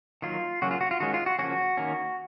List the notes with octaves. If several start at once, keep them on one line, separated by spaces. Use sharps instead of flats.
D#3 F#3 A#3 F4
C#3 F#3 A#3 C#4 F#4
F4
F#4
F4
D#3 G#3 C#4 F#4
F4
F#4
C#3 F3 A#3 C#4 F#4
D#3 A#3 C#4